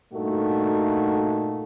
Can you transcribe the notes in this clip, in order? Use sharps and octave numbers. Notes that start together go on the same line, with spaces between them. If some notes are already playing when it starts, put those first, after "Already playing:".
G2 A#2 A3 D#4 F#4 A4